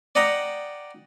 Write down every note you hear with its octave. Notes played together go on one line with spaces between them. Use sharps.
D5 D#5 F#5 G5 A#5